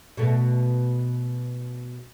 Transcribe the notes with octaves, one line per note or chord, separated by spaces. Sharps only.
B2 A3